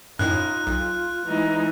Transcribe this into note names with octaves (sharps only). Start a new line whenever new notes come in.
F#2 A2 D#4 F4 F#6
B1 F4
E3 G#3 D#4